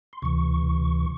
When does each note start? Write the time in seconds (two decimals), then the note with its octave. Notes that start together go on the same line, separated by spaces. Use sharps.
0.13 C6
0.22 D2 C3 E3 C#6